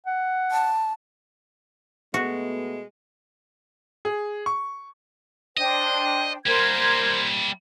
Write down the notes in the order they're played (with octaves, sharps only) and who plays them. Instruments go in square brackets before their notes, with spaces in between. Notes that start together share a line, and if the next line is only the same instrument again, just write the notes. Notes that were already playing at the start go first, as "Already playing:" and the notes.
[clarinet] F#5
[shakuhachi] A5
[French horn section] B2 A3 B3 [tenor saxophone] G#3 [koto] F#4
[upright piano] G#4
C#6
[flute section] D4 C5 G5 [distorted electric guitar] D#5
[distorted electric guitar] G3 A#3 [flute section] A#4 C5 G#6